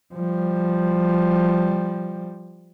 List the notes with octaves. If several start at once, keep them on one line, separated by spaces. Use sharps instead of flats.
F3 G3